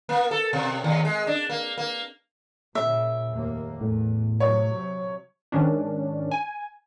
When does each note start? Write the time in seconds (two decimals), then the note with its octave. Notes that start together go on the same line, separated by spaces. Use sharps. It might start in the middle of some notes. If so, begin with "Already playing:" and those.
0.09 A#3
0.31 A4
0.53 B2
0.84 D#2
1.05 G#3
1.27 D4
1.50 A#3
1.78 A#3
2.75 A#2 C#3 E5
3.30 F1 D#2 A#3
3.81 E2 A2
4.40 C3 F#3 C#5
5.52 G#2 D#3 C#4 D4
6.31 G#5